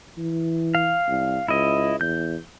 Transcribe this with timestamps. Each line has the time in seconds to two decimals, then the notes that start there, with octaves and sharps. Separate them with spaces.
0.18 E3
0.75 F5
1.08 C2
1.48 C#2 E4 D#5
2.01 E2 G6